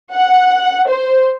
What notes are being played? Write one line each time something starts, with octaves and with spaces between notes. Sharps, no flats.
F#5
C5